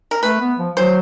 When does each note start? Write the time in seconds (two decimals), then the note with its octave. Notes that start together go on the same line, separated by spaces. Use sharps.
0.11 A#4
0.23 A3 B4
0.41 B3
0.58 F3
0.76 F#3 C5